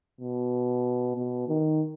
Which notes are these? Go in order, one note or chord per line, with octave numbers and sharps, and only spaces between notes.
B2
B2
D#3